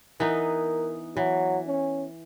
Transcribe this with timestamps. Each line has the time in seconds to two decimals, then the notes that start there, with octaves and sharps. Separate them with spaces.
0.20 E3 B3 D#4 A#4
1.17 E3 F#3
1.67 C#4